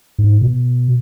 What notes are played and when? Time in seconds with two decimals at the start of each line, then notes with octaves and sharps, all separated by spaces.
0.19 G#2
0.41 B2